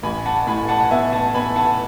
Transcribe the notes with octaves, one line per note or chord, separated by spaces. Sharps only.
A1 G#5 B5
F#5 A5
A2 G#5 B5
F#5 A5
F#5
B3 E5 G#5
F#5 A5
B3 G#5 B5
F#5 A5